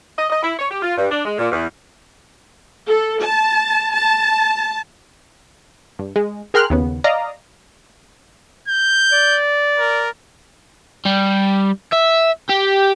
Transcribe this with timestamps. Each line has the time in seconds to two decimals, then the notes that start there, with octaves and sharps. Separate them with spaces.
0.17 D#5
0.29 D#5
0.42 E4
0.58 C#5
0.70 G4
0.82 F4
0.97 G2
1.10 D4
1.25 G#3
1.38 A#2
1.52 E2
2.87 A4
3.21 A5
3.91 A5
5.99 G2
6.16 G#3
6.54 G#4 A#4 G5 C6 F6 F#6
6.70 D#2 C#3 B3
7.04 D5 D#5 F5 A#5
8.68 G6
9.12 D5
9.78 A#4
11.05 G3
11.93 E5
12.50 G4